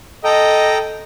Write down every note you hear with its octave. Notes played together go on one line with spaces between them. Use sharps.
A4 D#5 G5 A#5